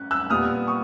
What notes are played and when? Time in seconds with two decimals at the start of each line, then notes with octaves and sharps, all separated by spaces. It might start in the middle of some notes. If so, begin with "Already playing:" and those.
Already playing: C#4 F#6
0.11 E6 F#6
0.30 A#2 G3 B3 D#6 F6
0.67 C#6 D#6